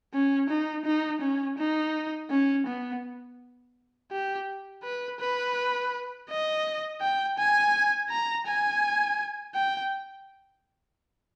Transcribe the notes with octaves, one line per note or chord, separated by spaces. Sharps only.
C#4
D#4
D#4
C#4
D#4
C#4
B3
G4
B4
B4
D#5
G5
G#5
A#5
G#5
G5